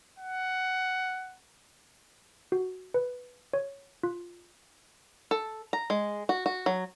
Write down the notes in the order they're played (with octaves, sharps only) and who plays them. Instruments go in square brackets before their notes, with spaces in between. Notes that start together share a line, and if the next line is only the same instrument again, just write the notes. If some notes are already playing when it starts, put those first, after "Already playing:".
[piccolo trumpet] F#5
[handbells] F#4
B4
C#5
F4
[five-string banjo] A4
A#5
G#3
F#4
F#4
F#3